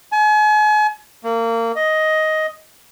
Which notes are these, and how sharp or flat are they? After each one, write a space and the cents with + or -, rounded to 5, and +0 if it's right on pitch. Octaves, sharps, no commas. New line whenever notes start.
G#5 +40
A#3 -25
D#5 +10